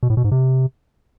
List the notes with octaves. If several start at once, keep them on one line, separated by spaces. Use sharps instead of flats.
B2
A2
B2
G#2
C3